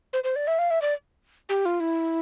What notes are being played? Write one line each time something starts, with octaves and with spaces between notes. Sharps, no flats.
C5
C5
D5
E5
F5
E5
D5
G4
F4
E4